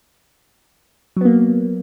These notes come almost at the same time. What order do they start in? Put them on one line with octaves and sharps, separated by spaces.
F#3 B3 A#3